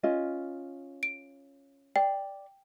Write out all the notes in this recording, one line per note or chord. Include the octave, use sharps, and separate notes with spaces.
C#4 F4 D#5
D7
D5 G5